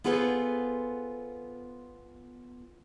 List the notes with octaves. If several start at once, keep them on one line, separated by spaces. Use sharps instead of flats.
B3 F4 G#4 A4 B4 C5